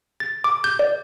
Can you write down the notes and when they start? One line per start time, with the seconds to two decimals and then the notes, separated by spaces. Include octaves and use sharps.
0.20 A6
0.44 D6
0.64 G6
0.79 D5